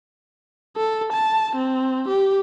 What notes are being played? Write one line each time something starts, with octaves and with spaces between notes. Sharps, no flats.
A4
A5
C4
G4